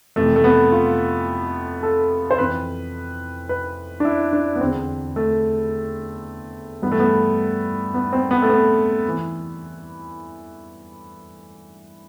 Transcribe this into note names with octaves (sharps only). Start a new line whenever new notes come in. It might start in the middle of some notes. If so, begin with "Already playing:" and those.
F2 C3 E3 A3
A3
B3
F4
A4
C5
F2 E3 B4
B4
D4
E4
D4
B3
E2 D3 C4
A3
G2 E3 B3
A3
B3
B3
C4
B3
A3
B3
E3